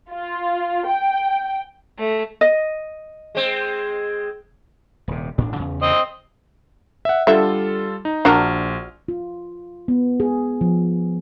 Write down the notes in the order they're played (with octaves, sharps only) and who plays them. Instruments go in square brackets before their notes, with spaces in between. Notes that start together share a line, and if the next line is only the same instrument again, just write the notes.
[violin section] F4
G5
[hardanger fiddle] A3
[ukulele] D#5
[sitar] G#3 C4
[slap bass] D#1 C3
A1 A2 D4
E2 C#3
[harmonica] C4 D#5
[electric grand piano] E5 F#5
[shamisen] D3 E5 [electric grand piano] G3 F4 A4
[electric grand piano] D#4
[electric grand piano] A#1 F6 [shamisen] D4 F#4 A#4
[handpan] F4
B3
G#4
F3